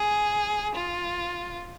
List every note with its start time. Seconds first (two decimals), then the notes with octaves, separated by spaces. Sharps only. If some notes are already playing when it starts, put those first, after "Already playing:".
Already playing: G#4
0.75 F4